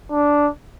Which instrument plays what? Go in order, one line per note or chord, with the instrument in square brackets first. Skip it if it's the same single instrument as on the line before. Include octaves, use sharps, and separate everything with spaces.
[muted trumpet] D4